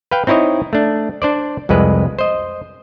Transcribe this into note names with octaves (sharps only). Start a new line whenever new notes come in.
B4 F5 G5
C4 D#4 E4 C#5 D#5
A3 D4
D4 C5 D5
C2 F2 G#3 B4
C5 D#5